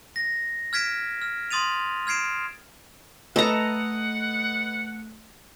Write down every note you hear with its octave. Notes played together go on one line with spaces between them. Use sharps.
A#6
F6 G#6 B6 D7 E7
F6
C6 D#6 A6 D#7 F7
F6 G#6 C7 D7 E7
A3 A4 B4 D#5 F#5 A#5